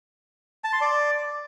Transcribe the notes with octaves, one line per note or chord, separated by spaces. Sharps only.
A5
C6
D5